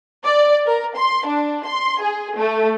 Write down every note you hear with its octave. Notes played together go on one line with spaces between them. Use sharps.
D5
A#4
C6
D4
C6
G#4
A3